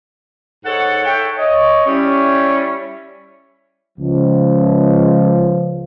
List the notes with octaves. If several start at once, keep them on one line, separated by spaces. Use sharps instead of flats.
G#2 A4 C#5 F#5
A4 C#5 E5 G5
C#5 D#5
G3 C#4 E4
C#2 F3